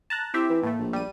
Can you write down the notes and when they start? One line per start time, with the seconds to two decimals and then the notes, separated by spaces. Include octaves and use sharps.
0.10 A5 A#5 F#6
0.34 C4 E4 G4 E5
0.50 E3
0.63 A2 A3 A#3
0.79 A#1
0.93 G3 D#7